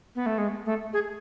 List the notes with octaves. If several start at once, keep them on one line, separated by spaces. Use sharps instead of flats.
B3
A3
G#3
A3
G#4